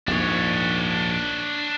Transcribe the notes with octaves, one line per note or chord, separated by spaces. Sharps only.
A#1 D#2 G#2 D4 C#5